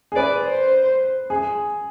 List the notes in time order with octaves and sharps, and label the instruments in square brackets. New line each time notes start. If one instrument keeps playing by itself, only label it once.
[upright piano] G#4
[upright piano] B4 [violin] D5
[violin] C5
[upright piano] G#4